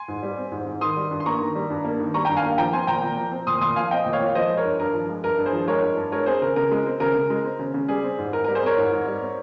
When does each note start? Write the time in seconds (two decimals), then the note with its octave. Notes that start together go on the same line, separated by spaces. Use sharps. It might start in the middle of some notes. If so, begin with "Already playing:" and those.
Already playing: G#5 C6
0.08 G#2
0.23 G3
0.37 C4
0.52 G#2
0.66 G#2
0.81 D#3 C6 D#6
0.97 G3
1.11 G2
1.20 C6
1.26 A#3 A#5 C#6
1.40 D#3
1.55 G3
1.70 G2
1.85 A#3
2.00 D#3
2.14 G3 A#5 C#6
2.25 G5 A#5
2.29 G2
2.37 F5 G#5
2.44 A#3
2.58 F3 G5 A#5
2.73 C4 G#5 C6
2.87 A#2 G5 A#5
3.03 A#2
3.17 F3
3.32 C4
3.47 A#2 C6 D#6
3.61 A#2 C6 D#6
3.76 F3 F5 G#5
3.91 C4 D#5 G5
4.06 A#2
4.13 C#5 F5
4.20 A#2
4.35 F3 C5 D#5
4.50 G#3
4.57 A#4 C#5
4.65 G2
4.79 G2 A#4
4.94 F3
5.09 G#3
5.23 G2 A#4
5.38 G2
5.46 G#4 C5
5.53 F3
5.68 G#3 A#4 C#5
5.83 G2
5.97 G2
6.12 G#3 A#4 C#5
6.26 C4 G#4 C5
6.42 C#3 A#4
6.56 C#3 A#4
6.71 G#3
6.86 C4
7.00 C#3 A#4
7.16 C#3
7.30 G#3
7.45 C4
7.59 C#3
7.74 C#3
7.88 G3 G#4
8.03 C4
8.18 G#2
8.33 G#2 A#4
8.44 A#4
8.48 G3
8.55 G#4 C5
8.63 C4 A#4 C#5
8.77 G#2
8.92 G#2
9.07 G3
9.22 C4